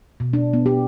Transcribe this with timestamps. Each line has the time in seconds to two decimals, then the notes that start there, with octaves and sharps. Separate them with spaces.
0.20 B2
0.33 D4
0.53 B3
0.66 G4